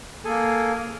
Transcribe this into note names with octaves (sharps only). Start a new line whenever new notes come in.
A#3 G#4 A4 G#5